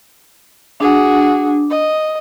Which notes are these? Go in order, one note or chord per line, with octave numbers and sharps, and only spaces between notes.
D4 F#4 G#4
D#5